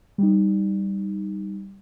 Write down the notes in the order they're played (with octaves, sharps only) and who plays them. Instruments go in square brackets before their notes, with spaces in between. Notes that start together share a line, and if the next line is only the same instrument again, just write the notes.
[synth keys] G3 D#4